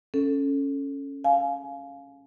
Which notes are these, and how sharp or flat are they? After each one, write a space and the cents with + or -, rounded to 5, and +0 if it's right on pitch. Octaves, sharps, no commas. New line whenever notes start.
C#4 +0 A4 +0
F5 +0 G#5 +30